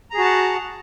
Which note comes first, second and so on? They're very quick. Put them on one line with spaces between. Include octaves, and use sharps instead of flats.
A#5 G#4 F#4 A5 F#5